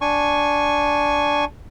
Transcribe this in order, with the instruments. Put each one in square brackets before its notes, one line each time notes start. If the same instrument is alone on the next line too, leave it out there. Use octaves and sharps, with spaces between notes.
[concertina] D4 G#5 C#6